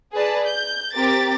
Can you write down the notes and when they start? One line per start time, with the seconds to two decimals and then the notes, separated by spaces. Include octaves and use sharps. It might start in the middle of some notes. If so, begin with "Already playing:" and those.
0.13 G#4 B4 D5 A5
0.46 G6
0.93 C4 G4 A#4 D6 A6